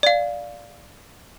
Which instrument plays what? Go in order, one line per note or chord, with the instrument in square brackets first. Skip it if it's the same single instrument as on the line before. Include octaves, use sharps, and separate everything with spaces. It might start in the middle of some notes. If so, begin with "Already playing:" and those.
[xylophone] D5 F5